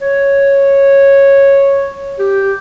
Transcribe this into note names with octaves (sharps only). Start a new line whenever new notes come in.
C#5
G4